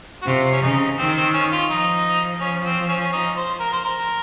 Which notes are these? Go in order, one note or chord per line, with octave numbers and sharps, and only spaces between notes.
F#4
C3 F4
C#4
C#3 D#4
D#3 C4
C4
C#4
F4
F3 D#4
C#4
C4
C#4
C#4
D#4
C5
A#4
C5
A#4